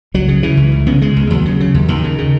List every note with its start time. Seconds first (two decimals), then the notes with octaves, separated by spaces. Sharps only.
0.14 C#2 F#3
0.28 C#3
0.43 C#3 E3
0.57 C#2
0.72 C#2
0.86 C#3 B3
1.01 C#3 G#3
1.16 C#2
1.30 D#2 F#3
1.45 C#3
1.60 C#3
1.74 D#2
1.88 D#2 D#3
2.04 C#3
2.18 C#3